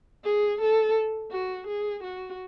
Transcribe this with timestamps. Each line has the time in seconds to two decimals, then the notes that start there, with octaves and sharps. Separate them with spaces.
0.25 G#4
0.61 A4
1.31 F#4
1.67 G#4
2.03 F#4